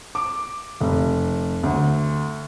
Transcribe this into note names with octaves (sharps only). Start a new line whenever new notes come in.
D6
F1
D2